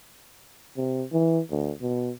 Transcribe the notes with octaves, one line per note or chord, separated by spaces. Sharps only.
C3
E3
D2
B2